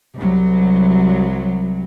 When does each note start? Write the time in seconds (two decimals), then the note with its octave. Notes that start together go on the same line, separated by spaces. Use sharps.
0.16 C2 F#3